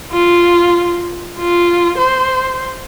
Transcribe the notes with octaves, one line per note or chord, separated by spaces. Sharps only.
F4
F4
C5